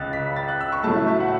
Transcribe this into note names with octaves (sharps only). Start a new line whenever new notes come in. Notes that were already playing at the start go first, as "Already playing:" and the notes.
Already playing: C#2 C#3 F#6 A6
B6
A6
F#6
E6
C#6
A2 F#3 A3 A5
E5
E5
F#5